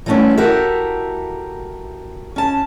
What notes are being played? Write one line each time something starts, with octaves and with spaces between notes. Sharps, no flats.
E3 G3 A3 B3 C#4 E4
E4 F#4 G4 A4 A#4 E5
C#4 A5